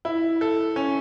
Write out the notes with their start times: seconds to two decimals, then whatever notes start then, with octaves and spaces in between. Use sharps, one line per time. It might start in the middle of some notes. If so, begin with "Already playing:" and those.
0.05 E4
0.41 A4
0.76 C#4